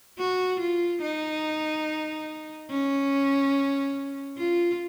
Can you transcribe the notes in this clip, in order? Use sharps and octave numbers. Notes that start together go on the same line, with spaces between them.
F#4
F4
D#4
C#4
F4